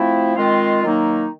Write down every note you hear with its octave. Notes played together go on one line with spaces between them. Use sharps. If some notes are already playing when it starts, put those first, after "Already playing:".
Already playing: F3 A3 C4 E4
D#3 G#3 C4 F4
D#3 F#3 A#3 D#4